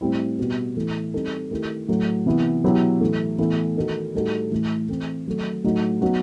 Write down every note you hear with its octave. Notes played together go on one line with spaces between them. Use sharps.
A2 G3 C4 E4
B2 G3 B3 F#4
A2 E3 A3
G3 C4 D#4 A4
D#3 A3 E4 G4
A2 F#3 A3
C3 E3 B3 E4
B2 F#3 B3 E4 G4
A2 E3 A3
A2 E3 B3 E4 A4
D#3 A3 D#4 F#4 A4
A2 G3 D#4 F#4 A4
A2 E3 A3
E3 A3 C4
D#3 F#3 A3
A2 F#3 A3 D#4 F#4
F#3 B3 D#4 F#4